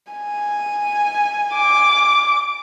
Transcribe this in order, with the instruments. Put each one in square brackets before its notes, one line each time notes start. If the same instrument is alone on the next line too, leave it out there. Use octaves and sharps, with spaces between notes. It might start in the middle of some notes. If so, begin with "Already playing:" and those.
[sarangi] G#5
[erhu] D6